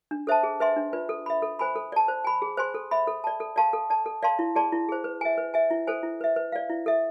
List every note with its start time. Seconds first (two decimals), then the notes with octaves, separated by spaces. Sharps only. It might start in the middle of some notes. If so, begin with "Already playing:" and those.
0.11 D4
0.27 A4 C5 E5 A5
0.43 G#4
0.60 B4 E5 G#5 C6
0.77 D4
0.93 F4 B4 D5
1.09 A4
1.26 E5 B5
1.42 A4
1.59 C5 G#5 B5
1.76 A4
1.92 D5 A5
2.08 C5
2.24 G#5 B5
2.42 G#4
2.57 C5 G#5 C6
2.74 A4
2.91 E5 B5
3.07 A4
3.24 D5 A5
3.40 A4
3.56 D5 F5 A5 C6
3.73 A4
3.90 D5 A5
4.06 A4
4.23 D5 F5 A5 C6
4.39 E4
4.55 G#4 D5 A5 C6
4.72 E4
4.89 G#4 C5
5.04 B4
5.21 E5 G#5
5.38 B4
5.54 E5 G#5
5.71 E4
5.87 A4 C5 G#5
6.03 E4
6.21 B4 E5
6.36 B4
6.52 D5 F5
6.70 E4
6.86 A4 E5